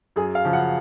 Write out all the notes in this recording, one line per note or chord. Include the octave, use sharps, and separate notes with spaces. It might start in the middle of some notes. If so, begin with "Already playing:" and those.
F#2 G#4
F5
C#3 F3
F#5